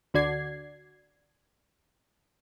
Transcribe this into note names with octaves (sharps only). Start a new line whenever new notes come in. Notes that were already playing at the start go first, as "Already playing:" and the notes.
D2 D3 F#4 D5 G#6 C7